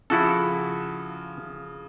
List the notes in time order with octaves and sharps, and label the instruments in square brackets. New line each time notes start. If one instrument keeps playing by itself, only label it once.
[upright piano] C#3 F3 [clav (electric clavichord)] E4 F#4 A4